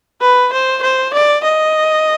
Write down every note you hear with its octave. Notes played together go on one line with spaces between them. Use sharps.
B4
C5
C5
D5
D#5